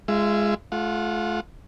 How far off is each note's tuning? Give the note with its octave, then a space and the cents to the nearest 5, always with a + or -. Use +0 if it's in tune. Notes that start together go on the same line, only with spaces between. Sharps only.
G#3 +0 F4 -20 E5 +10
A3 -40 F4 -5 F#5 -20